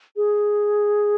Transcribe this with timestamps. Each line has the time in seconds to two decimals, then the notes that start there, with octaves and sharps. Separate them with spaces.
0.16 G#4